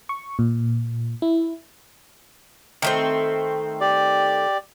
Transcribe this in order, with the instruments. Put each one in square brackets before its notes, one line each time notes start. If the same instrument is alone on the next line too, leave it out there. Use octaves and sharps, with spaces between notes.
[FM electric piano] C#6
A#2
E4
[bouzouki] D#3 A3 C4
[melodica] G4 D5